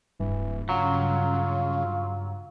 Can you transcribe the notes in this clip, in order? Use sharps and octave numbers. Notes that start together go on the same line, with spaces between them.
D1 G2 E3
C#3 F#3 F4